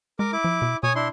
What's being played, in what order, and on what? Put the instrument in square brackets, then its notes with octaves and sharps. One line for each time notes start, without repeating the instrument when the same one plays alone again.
[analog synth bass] G#3 [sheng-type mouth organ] A#4 D6
[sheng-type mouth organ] E4 D6
[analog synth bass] F3
B2
[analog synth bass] B2 [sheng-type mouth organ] C#5 G#5 D#6
[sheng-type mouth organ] D4 E4 C6